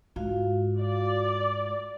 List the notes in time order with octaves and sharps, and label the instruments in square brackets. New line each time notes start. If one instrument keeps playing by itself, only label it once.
[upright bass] G#2 [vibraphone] F4 F#4 F5
[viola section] D5